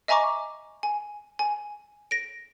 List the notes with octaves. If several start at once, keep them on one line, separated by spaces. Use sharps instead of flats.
D#5 E5 G#5 A#5 C#6 D6
G#5
G#5
A#6 D7